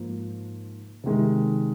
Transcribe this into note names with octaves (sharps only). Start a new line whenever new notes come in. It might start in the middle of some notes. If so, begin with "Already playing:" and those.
Already playing: G#2 F3 A#3
C3 D#3 G#3